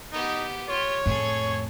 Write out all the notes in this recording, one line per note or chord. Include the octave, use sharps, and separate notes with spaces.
B3 D#4 G4
F4 G4 C#5
F2 A2 G#4 A4